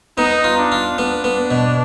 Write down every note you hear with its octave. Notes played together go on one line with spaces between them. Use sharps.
B3 D#4
F4
D4
F4
B3 D4
B3
B2